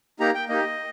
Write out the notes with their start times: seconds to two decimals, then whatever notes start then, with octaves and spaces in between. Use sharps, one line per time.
0.19 A#3 D#4 G4 A#5
0.35 G5
0.49 A#3 D#4 G4 D#5